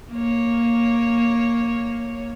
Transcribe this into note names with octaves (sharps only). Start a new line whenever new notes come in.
A#3 C#5